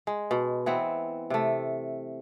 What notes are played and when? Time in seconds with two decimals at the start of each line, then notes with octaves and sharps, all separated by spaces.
0.07 G#3
0.31 B2
0.66 E3 B3 C4
1.30 C3 A3